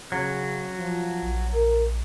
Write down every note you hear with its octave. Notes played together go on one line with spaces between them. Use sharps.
C#3 F#3
F3
A#1
A#4